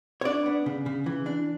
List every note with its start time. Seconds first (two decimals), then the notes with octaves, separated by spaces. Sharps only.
0.21 C#5
0.25 D4 D5
0.46 B3
0.66 C#3
0.86 C#3
1.06 E3
1.26 D4